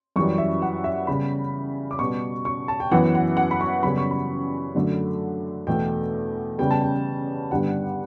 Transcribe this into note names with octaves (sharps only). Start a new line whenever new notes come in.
F#2 E3 G3 C#6
E5
F#5
E5
C#3 G3 B3 B5
D6
B2 G3 B3 C#6
C#6
A5
G5
F#2 E3 B3 F#5
F#5
F#5
B5
C#6
F#2 C#3 G3 B3 B5
C#6
B5
F#2 D3 F#3 A3
E2 B2 A3 G5
C#3 G3 B3 G5
A5
G5
G2 D3 G3 B3 F#5